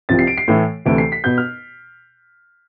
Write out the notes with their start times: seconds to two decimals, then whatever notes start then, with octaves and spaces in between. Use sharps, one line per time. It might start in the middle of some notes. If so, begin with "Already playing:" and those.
0.09 C2 C3 F3 C4 A6
0.19 C7
0.27 D7
0.38 C7
0.48 A2 E3 A3
0.86 D2 C3 E3 A3 D7
0.98 C7
1.12 B6
1.24 B2 B3 G6
1.38 F6